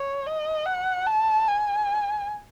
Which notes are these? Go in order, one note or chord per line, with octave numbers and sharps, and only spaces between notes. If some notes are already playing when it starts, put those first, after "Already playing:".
Already playing: C#5
D#5
F#5
A5
G#5